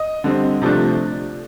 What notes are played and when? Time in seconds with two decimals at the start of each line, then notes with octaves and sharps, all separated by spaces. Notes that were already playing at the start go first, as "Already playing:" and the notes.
Already playing: D#5 D#6
0.24 D3 G3 C4
0.62 C3 F3 A3 D4